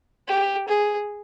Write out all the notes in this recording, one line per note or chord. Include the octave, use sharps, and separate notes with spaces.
G4
G#4